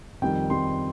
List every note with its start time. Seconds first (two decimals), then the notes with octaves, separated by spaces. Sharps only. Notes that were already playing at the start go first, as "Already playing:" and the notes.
0.22 F2 D#3 G3 G5
0.50 F2 D#3 G3 C6